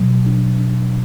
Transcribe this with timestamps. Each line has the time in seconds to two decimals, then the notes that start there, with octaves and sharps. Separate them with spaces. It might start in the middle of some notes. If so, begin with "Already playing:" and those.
Already playing: B2 F#3
0.26 D4
0.58 D4